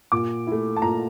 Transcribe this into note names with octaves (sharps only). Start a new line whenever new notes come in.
A#2 D6
A3 E4
A5
A#2 A#5